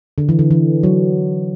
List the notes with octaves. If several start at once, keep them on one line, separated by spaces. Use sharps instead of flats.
D3
E3
D3
E3
F#3